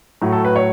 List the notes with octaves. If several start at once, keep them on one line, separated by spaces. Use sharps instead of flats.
A2 F#3
A4
B4
C#5